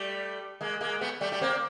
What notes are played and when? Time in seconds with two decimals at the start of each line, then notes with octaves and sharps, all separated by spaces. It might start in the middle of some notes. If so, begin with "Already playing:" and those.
Already playing: G3 A3
0.61 G#3 A#3
0.81 G#3 A#3
1.01 A3 B3
1.21 G3 A3
1.32 G3 A3
1.41 A#3 C4